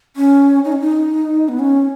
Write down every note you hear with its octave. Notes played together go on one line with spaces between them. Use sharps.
C#4
D#4
C#4
D#4
B3
C#4